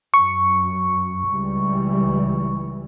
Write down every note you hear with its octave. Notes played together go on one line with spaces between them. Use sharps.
F#2 C#6
C#2 E3 G3